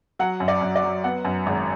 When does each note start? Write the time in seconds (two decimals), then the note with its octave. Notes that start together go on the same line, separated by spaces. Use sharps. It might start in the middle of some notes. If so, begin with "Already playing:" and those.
0.19 F#3 F#5
0.40 F#2
0.48 D5
0.61 F#2
0.76 D5
0.83 F#3
1.04 B3 F#5
1.25 F#2
1.46 G#1